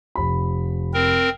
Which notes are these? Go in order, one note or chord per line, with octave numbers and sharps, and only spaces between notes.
F1 B5
C4 A#4